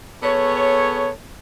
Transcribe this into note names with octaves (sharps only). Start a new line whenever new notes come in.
B3 G#4 A4 C#5